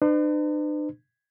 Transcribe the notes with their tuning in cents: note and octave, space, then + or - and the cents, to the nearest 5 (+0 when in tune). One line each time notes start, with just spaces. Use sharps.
D4 +45 B4 +45